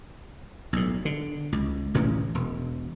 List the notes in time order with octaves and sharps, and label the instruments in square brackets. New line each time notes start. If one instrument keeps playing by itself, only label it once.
[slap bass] B1 A2
D3
C#2
A1 A2 E3 C#4
E1